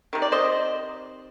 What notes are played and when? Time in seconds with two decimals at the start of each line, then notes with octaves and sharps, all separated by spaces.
0.13 C3 D#3
0.22 D5
0.32 C5 D#5